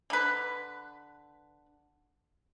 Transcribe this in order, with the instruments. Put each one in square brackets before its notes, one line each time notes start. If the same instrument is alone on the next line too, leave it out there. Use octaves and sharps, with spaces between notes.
[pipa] D3 B4